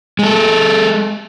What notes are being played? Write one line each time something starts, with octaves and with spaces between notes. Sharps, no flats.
G#3 A4